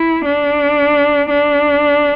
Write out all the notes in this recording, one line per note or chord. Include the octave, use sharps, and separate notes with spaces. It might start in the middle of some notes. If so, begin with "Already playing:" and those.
Already playing: E4
D4
D4